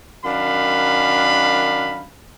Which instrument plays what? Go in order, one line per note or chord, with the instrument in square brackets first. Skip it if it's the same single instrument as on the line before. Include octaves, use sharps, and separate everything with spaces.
[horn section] F#2 D#3 D4 F5 B5